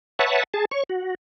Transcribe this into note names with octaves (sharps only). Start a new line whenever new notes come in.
B4 C#5 E5 F#5 A5
G#4 A5
C#5 C#6
F#4